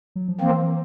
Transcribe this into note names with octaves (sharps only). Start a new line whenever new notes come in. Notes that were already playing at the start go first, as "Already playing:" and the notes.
F#3
F3
E3 A#3 C4